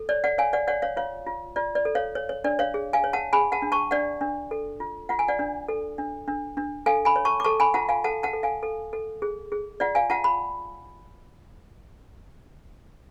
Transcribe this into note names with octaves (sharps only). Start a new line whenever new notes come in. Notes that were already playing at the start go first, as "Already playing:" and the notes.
Already playing: A4
C#5 D5
D5 F#5
C#5 F5 G#5
D5 F#5
C#5 D5 F#5
C#5 F5
F4 C#5 F5
F4
F4 D5
D5
A4
C#5 F5
C#5
C#5
D4 D5
C#5 F5
G#4
F5 G#5
C#5
F#5 A5
G#4 G#5 B5
F#5 A5
D4
A5 C#6
D4 D5 F#5
D4
A4
F4
F4 F#5
G#5
D5 F#5
D4
A4
D4
D4
D4
A4 F5 G#5
G#5 B5
C#5
A5 C#6
D6
A4 A5 C#6
G#5 B5
F4 F#5 A5
F5 G#5
A4 F#5 A5
F#5 A5
A4
F5 G#5
A4
A4
G#4
G#4
F4 D5 F#5
F5 G#5
F4 F#5 A5
B5